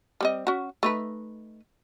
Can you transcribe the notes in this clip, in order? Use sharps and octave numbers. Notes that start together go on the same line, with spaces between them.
G3 C4 D#5
C#4 F#4
A3 D#4 B4